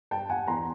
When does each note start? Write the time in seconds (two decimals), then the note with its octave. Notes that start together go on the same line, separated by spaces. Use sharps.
0.11 G2 G5 A5
0.30 F#5 G#5
0.47 E2 A#5 C6